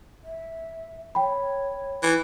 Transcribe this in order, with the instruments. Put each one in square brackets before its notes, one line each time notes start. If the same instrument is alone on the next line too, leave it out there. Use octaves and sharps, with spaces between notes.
[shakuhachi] E5
[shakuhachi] C#5 [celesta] G5 B5
[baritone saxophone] E3